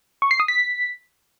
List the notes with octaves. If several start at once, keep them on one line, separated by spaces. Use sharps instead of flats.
C#6
C7
D#6
B6